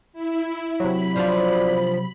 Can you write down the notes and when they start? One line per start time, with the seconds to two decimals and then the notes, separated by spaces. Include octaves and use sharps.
0.13 E4
0.80 C3 F#3 B5
1.16 F3 D4 F4 D5